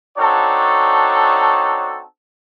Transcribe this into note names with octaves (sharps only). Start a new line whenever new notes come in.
C4 D4 D#4 F#4 A4 C#5